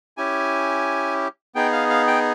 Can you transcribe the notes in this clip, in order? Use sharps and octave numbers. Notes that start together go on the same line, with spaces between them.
C#4 E4 G4 G#5
B3 D#4 G#4 G5
F5
F5
G5